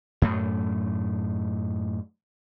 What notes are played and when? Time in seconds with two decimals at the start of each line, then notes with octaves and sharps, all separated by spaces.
0.22 F#2 A2 A3